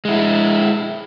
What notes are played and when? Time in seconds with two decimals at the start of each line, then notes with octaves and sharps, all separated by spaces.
0.05 G#3 E4